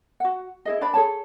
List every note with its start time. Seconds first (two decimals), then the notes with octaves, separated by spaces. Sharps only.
0.20 F#4 F#5
0.65 E4 G#4 D#5
0.81 D4 B4 D5 B5
0.94 G#4 A4 C#5 A5